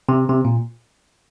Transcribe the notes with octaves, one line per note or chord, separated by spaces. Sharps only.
C3
C3
A#2